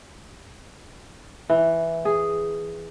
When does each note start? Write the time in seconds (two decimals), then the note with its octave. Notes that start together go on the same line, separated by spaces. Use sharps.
1.49 E3
2.05 G#4